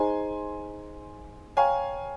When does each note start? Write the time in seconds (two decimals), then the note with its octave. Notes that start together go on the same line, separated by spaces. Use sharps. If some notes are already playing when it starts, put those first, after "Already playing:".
Already playing: D#4 G#4 C5 D#5 G#5 A#5 C6
1.57 C#5 F5 G5 G#5 A#5 C#6